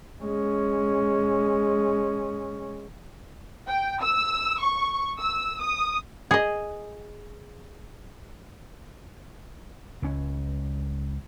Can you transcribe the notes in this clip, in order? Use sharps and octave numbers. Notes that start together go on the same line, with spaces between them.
G#3 C#4
G5
E6
C#6
E6
D#6
G#4 D#5
C#2 C#4